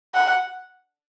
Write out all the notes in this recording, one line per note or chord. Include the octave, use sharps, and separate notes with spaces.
F#5